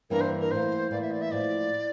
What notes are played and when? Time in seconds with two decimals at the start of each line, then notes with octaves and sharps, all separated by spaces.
0.10 G2 E3 A#3 D4 A#4
0.20 C5
0.40 A#4
0.51 A2 E3 A#3 C5
0.91 A2 E3 A#3 D5
1.01 E5
1.11 D5
1.21 E5
1.31 A2 F3 A#3 D5